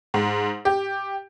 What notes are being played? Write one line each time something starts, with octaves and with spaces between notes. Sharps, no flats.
G#2
G4